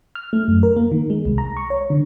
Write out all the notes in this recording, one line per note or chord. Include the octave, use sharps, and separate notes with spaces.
F6
A3
F#2
A#4
A#3
D#3
G#3
C2
A#5
C#6
C#5
D3